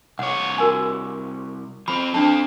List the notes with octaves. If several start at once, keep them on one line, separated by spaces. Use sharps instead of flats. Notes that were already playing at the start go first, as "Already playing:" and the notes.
C2 C#5 F#5
F#4 A#4 G#5
F3 C4 B5
C4 D4 A4 A5